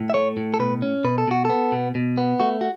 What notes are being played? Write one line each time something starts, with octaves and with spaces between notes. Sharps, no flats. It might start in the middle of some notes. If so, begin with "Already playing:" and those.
Already playing: A2
E5
A3 C#5
A2
A4
B2 B4
C#4
B2 B4
A4
B2 F#4
B3 A4
B2
B2
B3
A3 F#4
F#4